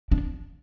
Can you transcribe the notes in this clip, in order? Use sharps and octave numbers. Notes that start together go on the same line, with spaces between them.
D4